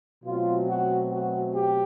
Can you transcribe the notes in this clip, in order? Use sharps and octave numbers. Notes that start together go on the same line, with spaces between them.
B2 F#3 A3 C4 F4
F#4
F#4
G4